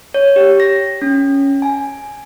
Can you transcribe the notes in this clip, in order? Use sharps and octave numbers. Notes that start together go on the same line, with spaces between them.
C#5
G4
A#6
C#4
G#5